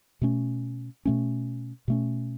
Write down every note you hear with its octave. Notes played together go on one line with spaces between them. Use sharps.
B2 A3 C#4
B2 A3 C#4
B2 A3 C#4